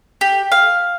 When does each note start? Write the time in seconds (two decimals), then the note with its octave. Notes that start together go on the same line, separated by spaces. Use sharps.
0.21 G4
0.52 F5